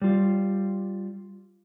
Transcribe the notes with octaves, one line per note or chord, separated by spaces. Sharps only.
G3 F4